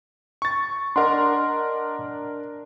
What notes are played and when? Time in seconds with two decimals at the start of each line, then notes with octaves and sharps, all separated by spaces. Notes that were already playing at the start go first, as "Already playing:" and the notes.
0.42 C#6 A6
0.96 D4 A#4 D5 D#5 F#5 C6